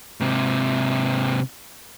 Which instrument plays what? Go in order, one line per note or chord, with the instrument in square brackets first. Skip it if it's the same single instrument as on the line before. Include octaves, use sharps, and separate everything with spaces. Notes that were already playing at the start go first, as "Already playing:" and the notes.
[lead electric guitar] G#2 C3